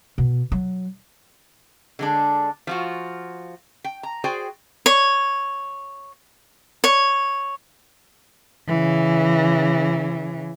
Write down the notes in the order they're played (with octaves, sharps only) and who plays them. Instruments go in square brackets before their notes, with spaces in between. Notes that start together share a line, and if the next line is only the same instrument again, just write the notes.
[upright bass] B2
F#3
[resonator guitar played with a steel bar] D3 G#3 D4
F3 F4 F#4
G5
A#5
F#4 G#4 C5 D5 G5
[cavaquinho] C#5
C#5
[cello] C#3 E3